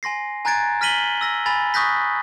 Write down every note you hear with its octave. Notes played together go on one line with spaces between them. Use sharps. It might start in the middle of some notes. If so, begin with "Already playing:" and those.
G#5 C6 A#6 C7
G#5 A#5 F#6 G#6 A6 D7
F6 A#6 B6 D#7 F#7 G7
E6 A#6
G#5 B5 A6
C#6 D#6 F#6 G6 A#6 B6